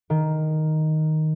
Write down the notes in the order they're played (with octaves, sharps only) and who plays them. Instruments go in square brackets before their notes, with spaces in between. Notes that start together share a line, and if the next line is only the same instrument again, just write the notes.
[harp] D#3